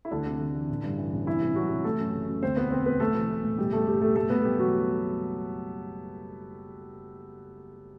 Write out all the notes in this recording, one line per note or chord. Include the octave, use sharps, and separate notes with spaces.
E4
D2 D3 D4
C3
D2
E3
A1
G2
E3
A1
C2 E3 E4
C3
C2 F#3 F#4
C2
E3 A3 A4
F#2
F#1
F#2
D2 C4 C5
E1 B3 B4
E1 C4 C5
E1 B3 B4
B1 A3 A4
E3
E3
A2
B2 G3 G4
F#1 A3 A4
B2 G3 G4
F#1 A3 A4
B1 A3 A4
B1 B3 B4
B1 G3 G4
E3 F#3 F#4